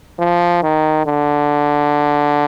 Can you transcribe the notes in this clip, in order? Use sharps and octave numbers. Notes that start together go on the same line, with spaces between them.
F3
D#3
D3